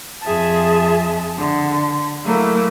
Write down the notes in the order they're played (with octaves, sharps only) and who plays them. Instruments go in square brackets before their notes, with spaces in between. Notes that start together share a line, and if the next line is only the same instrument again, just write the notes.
[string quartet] F2 G#4 E5 A5
D3
F#3 A3 A#3 E4